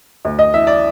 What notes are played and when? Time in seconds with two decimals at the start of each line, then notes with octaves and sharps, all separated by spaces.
0.25 D2
0.39 D#5
0.54 E3 E5
0.67 D5